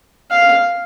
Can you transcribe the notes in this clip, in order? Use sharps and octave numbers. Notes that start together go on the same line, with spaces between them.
F5